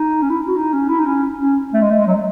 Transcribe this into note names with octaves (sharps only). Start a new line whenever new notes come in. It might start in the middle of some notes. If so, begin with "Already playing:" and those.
Already playing: D#4
C#4
E4
F#4
D#4
C#4
E4
D#4
C#4
C#4
A3
G#3
A3
G#3
F#3
G#3